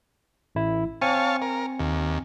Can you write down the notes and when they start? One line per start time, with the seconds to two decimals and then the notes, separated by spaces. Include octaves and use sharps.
0.55 A1 E4
1.02 C4 C#5 F5 G#5 A5 C#7
1.42 A#4
1.80 D#2